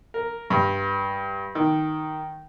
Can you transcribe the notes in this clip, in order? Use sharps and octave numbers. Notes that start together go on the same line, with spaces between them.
A#4
G2
D#3